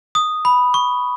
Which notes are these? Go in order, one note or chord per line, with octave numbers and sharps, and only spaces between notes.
D#6
B5
C#6